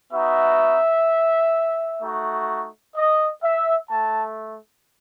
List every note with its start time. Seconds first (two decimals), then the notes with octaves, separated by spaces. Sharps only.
0.12 B3 D#4 F#4 E5
2.02 A3 D#4 F#4
2.96 D#5
3.43 E5
3.90 A3 A5